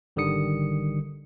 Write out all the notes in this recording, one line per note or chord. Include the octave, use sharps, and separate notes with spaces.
G#1 D3 D#3 G3 D#6 C#7